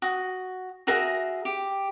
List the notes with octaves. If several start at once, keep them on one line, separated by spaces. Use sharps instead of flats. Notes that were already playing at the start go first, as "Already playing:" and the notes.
F#4 D#6
F#4 G#4 A#4 E5
G4